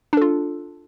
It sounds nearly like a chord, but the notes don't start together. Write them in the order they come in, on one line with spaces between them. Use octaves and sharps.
D4 A4 F4